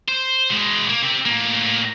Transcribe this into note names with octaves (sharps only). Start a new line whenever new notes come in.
C5
B2 G#3
A#3
C3 C4
A2 A#3